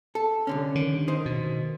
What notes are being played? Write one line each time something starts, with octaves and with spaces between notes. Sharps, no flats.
A4
C2 D3 C#4
D#3
D#4 C5
B2 D#3